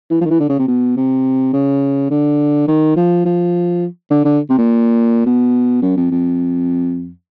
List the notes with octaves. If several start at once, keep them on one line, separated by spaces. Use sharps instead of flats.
E3
F3
D#3
E3
D3
C#3
C3
B2
C3
C#3
D3
D#3
F3
F3
D3
D3
C3
A#2
B2
F#2
F2
F2